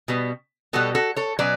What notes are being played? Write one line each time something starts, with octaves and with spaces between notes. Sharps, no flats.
B2 G3 B3
B2 G3 B3 F#4 A4
F#4 A4
A4 C#5
B2 F#3 C#4 B4 D5